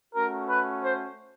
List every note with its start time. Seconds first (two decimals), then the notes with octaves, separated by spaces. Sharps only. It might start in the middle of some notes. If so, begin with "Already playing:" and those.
0.15 A3 C#4 F#4 A#4
0.49 B4
0.82 C5